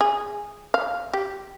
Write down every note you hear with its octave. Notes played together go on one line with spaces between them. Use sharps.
G#4
F5
G4